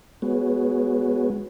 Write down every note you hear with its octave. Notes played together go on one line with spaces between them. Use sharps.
G#3 B3 F#4 G#4 B4 C#5